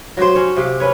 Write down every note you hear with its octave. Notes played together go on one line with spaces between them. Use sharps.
F#3 F#4 G4 C5
C#4 C#5
C3 G4 F5
C#4 B4 C#5